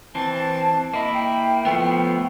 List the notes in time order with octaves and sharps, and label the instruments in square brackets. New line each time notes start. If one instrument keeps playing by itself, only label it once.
[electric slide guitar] E3 C4 [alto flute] A5
[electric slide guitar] A#3 E4 [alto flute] D#5
[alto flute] G5
[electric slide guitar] F3 A3 B3